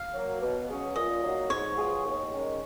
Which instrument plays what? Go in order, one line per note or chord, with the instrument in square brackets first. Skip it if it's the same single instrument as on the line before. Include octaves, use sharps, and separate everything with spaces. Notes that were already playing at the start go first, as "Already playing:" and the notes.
Already playing: [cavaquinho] F5
[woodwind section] F#3 A#3
B2
F#3 C#4 G#4
[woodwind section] A#2 [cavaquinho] D#5
[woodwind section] F#3 A#3 D#4 F#4
[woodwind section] G#2 [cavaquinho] C#5
[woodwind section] F#3 B3 F4 G#4
D#2
D#3 G#3 C#4